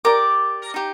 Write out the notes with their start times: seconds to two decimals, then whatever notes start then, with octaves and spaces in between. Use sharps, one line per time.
0.05 G4 A#4 D5 D6
0.74 D#4 G4